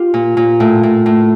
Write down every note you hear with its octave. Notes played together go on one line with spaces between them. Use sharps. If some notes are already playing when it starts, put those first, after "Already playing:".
Already playing: F4 G4
A#2
A#2
A2
A2
A2